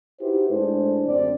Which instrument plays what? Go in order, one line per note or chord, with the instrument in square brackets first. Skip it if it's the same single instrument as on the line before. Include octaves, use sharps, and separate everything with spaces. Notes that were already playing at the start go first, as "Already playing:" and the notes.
[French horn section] D#4 E4 F#4 G4 B4 C5
A2 G#3 D4 C5
F#2 D3 C4 D5